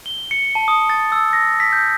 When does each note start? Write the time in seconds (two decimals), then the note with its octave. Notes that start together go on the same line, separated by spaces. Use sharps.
0.06 G7
0.31 C#7
0.55 A5
0.68 D#6
0.90 A6
1.12 E6
1.33 A#6
1.60 B6
1.73 G6